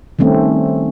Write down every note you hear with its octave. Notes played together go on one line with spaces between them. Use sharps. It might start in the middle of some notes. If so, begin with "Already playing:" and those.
D#3 G3 A3 C4 C#4